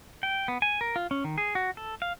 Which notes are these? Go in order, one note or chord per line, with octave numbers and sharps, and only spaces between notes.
G5
B3
G#5
A#4
F4
C#4
D#3
G#4
F#4
A4
F5